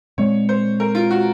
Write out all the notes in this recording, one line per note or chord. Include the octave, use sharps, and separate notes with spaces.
A#2 G#3 C4 C#5
C5
A#4
F4
F#4